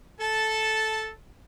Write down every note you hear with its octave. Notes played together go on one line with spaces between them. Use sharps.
A4 A5